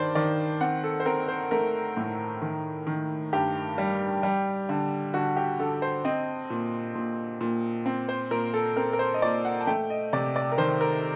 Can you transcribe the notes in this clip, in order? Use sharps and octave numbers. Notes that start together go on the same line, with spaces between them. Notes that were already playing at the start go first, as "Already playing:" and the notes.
Already playing: G2 D#3 C5 D5
D#3 D5
C4 F#5
A4
C5
C4 A#4
C5
A3 A#4
A2
D#3
D#3
G2 G4
G3
G3
D3
D3 F#4
G4
D3 A4
C5
C4 D#5
A#2
A#2
A#2
C4
C5
A#2 A#4
A4
C4 A#4
A#4
C5
D#5
A#2 D5
F#5
A5
A3 G5
D#5
C3 D5
D5
A#4
D#3 C5
A#4